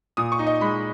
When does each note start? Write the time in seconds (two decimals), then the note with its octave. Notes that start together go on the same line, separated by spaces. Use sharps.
0.17 A#2 D#6
0.32 C#6
0.39 D#4
0.47 D#5
0.61 G#3 B5